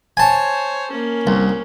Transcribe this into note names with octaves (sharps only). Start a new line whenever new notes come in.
C5 C#5 G#5 A5
A#3 C#4
C2